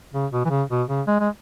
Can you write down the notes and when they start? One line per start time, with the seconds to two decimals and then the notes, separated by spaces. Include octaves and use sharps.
0.14 C#3
0.32 B2
0.45 E3
0.50 C#3
0.70 B2
0.89 C#3
1.07 G#3
1.20 G#3